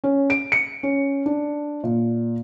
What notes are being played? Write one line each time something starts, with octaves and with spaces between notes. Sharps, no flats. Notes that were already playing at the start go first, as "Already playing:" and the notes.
C#4
D7
C#7
C#4
D4
A#2